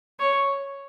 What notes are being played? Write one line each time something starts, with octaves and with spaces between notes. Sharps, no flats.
C#5